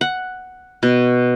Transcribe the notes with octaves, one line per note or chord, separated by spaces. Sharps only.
F#5
B2